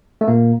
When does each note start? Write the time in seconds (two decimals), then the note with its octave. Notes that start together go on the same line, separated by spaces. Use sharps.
0.21 A3
0.28 A#2 A#3